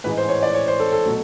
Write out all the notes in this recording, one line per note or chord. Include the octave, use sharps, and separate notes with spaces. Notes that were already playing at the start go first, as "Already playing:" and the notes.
A1 G#2 E3 G#3 B4
C5
C#5
D5
C#5
C5
A4
A4
B2 F#3 A3